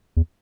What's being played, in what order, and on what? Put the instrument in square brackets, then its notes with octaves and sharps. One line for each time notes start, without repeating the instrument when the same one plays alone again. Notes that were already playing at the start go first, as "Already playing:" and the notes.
[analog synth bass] E2